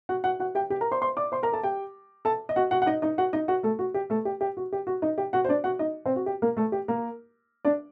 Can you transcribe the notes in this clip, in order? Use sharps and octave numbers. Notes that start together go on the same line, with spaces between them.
F#4 F#5
F#4 F#5
F#4 F#5
G4 G5
G4 G5
A#4 A#5
C5 C6
C5 C6
D5 D6
C5 C6
A#4 A#5
A4 A5
G4 G5
A4 A5
D#5
F#4 F#5
F#4 F#5
F#5
D#4 D#5
D#4 D#5
F#4 F#5
D#4 D#5
F#4 F#5
A3 A4
F#4
G4
A3 A4
G4
G4
F#4
G4
F#4
D#4 D#5
G4 G5
F#4 F#5
C5
D4 D5
F#4 F#5
D#4 D#5
C4 C5
F#4
G4
A#3 A#4
A3 A4
G4
A#3 A#4
D4 D5